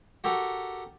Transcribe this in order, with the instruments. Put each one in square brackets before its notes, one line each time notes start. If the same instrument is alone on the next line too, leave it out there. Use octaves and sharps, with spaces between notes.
[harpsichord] F#4 G4 A4 A#4